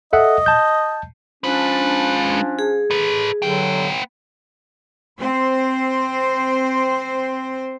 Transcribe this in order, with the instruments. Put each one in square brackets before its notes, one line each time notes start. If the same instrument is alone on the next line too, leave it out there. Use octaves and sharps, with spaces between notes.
[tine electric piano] A4 E5 F#5 [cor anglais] D#5
[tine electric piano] A5 G6
[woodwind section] F3 C#4 D4 [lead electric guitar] G#3 B4
[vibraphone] G#4
[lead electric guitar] A4 B4
[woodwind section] G2 D3 F#3 [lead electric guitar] B3 G5
[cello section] C4 C5